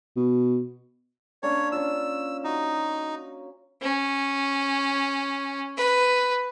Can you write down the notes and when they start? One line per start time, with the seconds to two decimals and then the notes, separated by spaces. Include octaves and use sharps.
0.16 B2
1.43 A#3 C#4 D4 C#5
1.72 C#4 F4 E6
2.44 D#4 F#4
3.82 C#4
5.77 B4